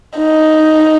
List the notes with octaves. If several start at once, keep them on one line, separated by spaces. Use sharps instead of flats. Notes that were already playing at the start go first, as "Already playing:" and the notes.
D#4